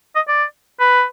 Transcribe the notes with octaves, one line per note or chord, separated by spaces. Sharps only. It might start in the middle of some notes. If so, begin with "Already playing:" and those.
D#5
D5
B4